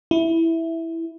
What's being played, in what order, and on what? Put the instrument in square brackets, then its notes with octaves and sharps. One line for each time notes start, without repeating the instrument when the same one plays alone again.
[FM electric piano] E4